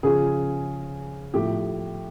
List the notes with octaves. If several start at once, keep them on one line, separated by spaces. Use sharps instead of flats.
C#3 F3 G#4
A2 F3 G4